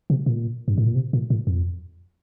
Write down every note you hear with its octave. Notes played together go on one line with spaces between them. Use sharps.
C3
A#2
G2
A2
A#2
C3
A#2
A2
F2